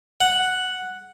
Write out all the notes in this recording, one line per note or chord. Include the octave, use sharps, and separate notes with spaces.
F#5